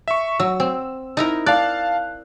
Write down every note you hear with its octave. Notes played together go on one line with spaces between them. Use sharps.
E5 C#6
F#3 E6
C4
D#4 E4 A#4
D5 F5 A5 F#6